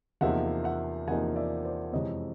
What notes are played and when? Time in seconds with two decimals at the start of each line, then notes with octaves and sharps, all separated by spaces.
0.21 E2 C3 F3 A#3 D#4 E5 F#5
0.64 E5 F#5
1.07 E2 C3 F3 A#3 D#4 F#5 G#5
1.36 D5 E5
1.65 C5 D5
1.93 F2 C3 E3 G#3 C#5 D#5